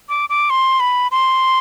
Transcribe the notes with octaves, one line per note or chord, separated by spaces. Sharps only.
D6
D6
C6
B5
C6